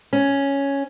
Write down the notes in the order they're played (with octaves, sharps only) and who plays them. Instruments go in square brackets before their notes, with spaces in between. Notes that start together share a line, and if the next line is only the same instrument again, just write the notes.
[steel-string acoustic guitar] C#4